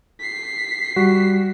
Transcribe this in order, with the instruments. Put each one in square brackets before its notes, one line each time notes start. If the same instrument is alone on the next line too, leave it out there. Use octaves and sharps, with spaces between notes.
[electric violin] B6 C7
[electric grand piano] G3 F#4